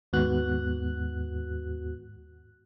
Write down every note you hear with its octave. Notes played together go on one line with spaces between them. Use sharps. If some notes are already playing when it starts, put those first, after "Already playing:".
D#2 G#2 B3 F#4 F#6